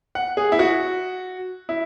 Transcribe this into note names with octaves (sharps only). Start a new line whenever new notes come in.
F#5
G#4
E4
F#4
E4